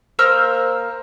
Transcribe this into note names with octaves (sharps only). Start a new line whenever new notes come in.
A#3 C5 E6 F6